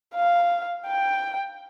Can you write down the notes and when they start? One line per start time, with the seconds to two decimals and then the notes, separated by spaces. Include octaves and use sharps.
0.15 F5
0.87 G5